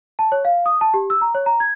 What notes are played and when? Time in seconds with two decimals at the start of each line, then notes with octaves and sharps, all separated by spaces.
0.19 A5
0.32 C#5
0.45 F5
0.66 D#6
0.81 A5
0.94 G4
1.10 E6
1.22 A#5
1.35 C#5
1.46 A#5
1.60 G#6